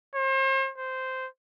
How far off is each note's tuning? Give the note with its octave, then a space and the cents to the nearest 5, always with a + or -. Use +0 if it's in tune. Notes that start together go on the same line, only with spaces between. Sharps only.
C5 +40
C5 -10